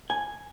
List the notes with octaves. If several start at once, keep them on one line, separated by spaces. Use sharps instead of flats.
G#5